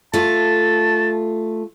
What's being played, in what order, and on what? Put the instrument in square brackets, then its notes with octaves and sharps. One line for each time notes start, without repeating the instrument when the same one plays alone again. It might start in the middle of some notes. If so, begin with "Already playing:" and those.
[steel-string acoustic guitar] A3 F4 [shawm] A5